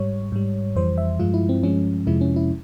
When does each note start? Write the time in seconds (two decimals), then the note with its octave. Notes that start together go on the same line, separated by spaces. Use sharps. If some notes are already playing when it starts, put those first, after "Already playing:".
Already playing: G#2 G3 C#5
0.32 G#2 G3
0.76 F2 E3 G3 C5
0.98 E5
1.19 G2 F3 G#3 F4
1.34 E4
1.49 C4
1.63 G2 F3 G#3 C#4
2.07 F2 C3 F3 G#3 E4
2.21 C#4
2.36 E4